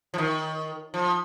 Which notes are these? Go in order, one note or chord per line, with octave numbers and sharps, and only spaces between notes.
F3
D#3
F3